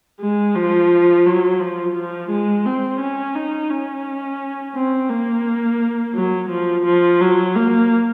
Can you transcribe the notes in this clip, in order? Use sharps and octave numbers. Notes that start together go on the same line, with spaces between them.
G#3
F3
F#3
F3
F3
G#3
C4
C#4
D#4
C#4
C4
A#3
F#3
F3
F3
F#3
A#3